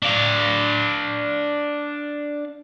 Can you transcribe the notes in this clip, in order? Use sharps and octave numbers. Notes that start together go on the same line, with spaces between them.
D4 F5